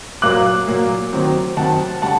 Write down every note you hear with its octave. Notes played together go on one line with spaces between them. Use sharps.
A#2 F#3 A#3 D6 F#6
A#2 F#3 A#3
D#3 F#3 C4
D#3 F#3 C4 F#5 A5
D3 G3 F#5 A5